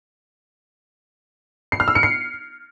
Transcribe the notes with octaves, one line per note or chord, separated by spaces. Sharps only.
C7
F6
E6
C#7
C7